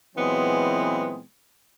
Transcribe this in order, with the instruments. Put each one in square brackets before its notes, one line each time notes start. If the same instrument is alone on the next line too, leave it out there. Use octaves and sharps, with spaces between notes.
[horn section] A#2 E3 F#3 G#3 B3 C4